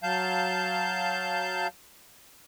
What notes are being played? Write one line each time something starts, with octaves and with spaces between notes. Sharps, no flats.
F#3 F5 A5 G6